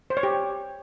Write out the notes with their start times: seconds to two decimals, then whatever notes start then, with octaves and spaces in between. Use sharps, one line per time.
0.10 C5
0.17 C#5
0.23 G4